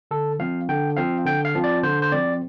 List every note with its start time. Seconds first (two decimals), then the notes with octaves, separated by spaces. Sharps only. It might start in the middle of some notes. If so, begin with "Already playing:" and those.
0.11 D3 A4
0.39 F3 C4 F5
0.68 D3 G5
0.97 F3 C4 F5
1.26 D3 G5
1.45 F5
1.55 F3 C4
1.64 D5
1.83 D3 C5
2.02 C5
2.12 F3 C4 D5